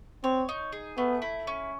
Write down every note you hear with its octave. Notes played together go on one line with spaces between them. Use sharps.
C4 C#5
D#4
G#4
A3 B3
E4
C#4